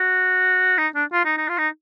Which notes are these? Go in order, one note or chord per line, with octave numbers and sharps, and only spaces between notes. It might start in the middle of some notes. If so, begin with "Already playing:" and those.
Already playing: F#4
D#4
D4
F4
D#4
D#4
F4
D#4